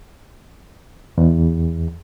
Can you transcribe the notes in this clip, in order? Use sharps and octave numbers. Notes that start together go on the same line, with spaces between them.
E2